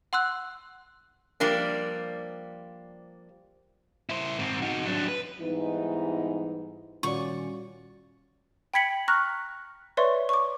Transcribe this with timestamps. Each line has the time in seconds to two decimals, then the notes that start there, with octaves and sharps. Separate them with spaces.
0.13 F#5 C6 E6 F#6
1.40 F3 G3 A#3 D4
4.09 E4 C5
4.39 G#2 C4
4.62 D#4 F#4
4.86 F#3 D4
5.08 B4
5.40 G#2 E3 G3 B3 D#4
7.03 A#2 D#3 G3 C#4 F4 F#4 D5 C#6
8.74 G5 B5 G#6 B6 C#7 F#7
9.08 A#5 C#6 F6 F#6 A#6
9.97 B4 C#5 D5 E5 C6 C#6
10.29 C#6 D6